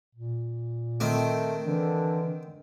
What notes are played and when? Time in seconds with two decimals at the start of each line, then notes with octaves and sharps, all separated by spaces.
0.15 A#2
1.00 D#3 A3 C4
1.65 D3 E3